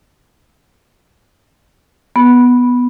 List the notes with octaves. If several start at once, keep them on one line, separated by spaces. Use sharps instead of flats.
B3